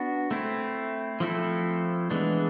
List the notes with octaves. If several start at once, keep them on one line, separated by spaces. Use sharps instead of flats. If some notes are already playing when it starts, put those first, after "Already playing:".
Already playing: B3 D4 F#4
A3 C4 E4
F3 A3 C4 E4 A4
E3 G#3 B3 D4